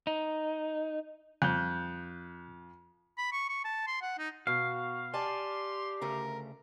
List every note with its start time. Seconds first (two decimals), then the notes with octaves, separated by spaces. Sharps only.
0.07 D#4
1.42 F2 F#6 G6
3.18 B5
3.32 C#6
3.49 C#6
3.65 A5
3.87 C6
4.02 F#5
4.18 D#4
4.47 B2 F#4 F5
5.13 G4 D5 G#5 A5 C6
6.01 D2 C#3 A3 A#4